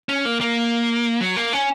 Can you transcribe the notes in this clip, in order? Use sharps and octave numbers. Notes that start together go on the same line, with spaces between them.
C#4
A#3
A#3
F#3
A#3
C#4